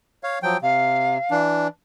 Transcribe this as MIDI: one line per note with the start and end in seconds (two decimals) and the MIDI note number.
0.23 0.39 73
0.23 0.39 77
0.43 0.57 53
0.43 0.57 54
0.43 0.57 79
0.62 1.18 48
0.62 1.39 77
1.31 1.68 52
1.31 1.68 62